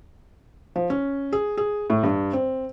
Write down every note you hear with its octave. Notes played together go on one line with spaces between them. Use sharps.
F3
C#4
G#4
G#4
A2
G2
C4